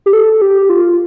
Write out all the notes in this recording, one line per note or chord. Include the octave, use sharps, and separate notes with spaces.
G4
A4
G4
F4